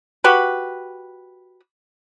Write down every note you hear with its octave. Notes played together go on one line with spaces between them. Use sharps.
F#4 G4 B4